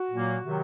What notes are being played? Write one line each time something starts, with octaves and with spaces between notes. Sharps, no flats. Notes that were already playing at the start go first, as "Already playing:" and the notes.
Already playing: F#4
A#2 F#3 A#3
C3 D#3 F#3